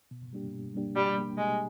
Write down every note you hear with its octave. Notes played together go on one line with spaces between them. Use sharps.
B2
G3 A#3 D4 G4
B2
G3 A#3 D4 G4
B2 G3
G3 A#3 D4 G4
B2 G#3